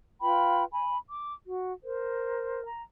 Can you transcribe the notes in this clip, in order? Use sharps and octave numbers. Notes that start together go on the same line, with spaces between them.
F4 B4 G5 B5
G#5 B5
D6
F#4
A#4 C5
A#5